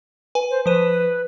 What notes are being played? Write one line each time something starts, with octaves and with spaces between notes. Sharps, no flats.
B4 G#5
C5
F3 B4 C5 D#7